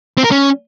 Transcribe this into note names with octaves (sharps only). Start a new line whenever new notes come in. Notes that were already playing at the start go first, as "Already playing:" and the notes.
C4
A#4
C#4